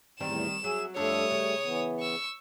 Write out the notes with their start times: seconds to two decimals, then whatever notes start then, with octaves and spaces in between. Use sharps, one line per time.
0.20 E2 A2 D#3 G3 C4 E7
0.64 F#3 G#4 E5
0.96 F2 D3 G3 A3 A4 C#5 D#6
1.31 C#3
1.64 E3 B3
1.99 C#6 E6